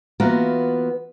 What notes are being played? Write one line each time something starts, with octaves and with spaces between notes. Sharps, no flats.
E3 A#3 B3 F4 F#4